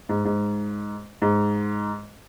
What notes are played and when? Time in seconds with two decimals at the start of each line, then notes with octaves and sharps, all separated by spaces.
0.09 G#2
0.25 G#2
1.22 G#2